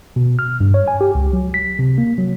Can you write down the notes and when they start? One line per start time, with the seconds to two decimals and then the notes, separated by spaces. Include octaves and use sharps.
0.16 B2
0.39 F6
0.61 G2
0.74 C#5
0.88 G#5
1.01 G4
1.15 C#2
1.33 F#3
1.54 B6
1.79 C3
1.98 A#3
2.18 F#3